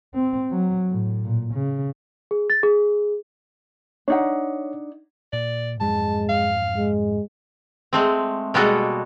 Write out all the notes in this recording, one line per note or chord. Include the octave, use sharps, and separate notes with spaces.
C4
F#3
A2
A#2
C#3
G#4
A6
G#4
D4 D#4 C#5 F#5
A#2 D5
F2 G#2 F#3 G#3 A5
F5
G#3
G#3 A3 C4
B2 G3 G#3 A#3 F#4 A4